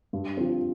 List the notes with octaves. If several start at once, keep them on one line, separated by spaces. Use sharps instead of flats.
G2
F3 C4